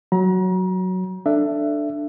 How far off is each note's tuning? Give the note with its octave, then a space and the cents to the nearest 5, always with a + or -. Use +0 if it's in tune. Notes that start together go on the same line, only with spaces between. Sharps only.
F#3 +0 A#5 +35
D4 +10 A4 +5 E5 +20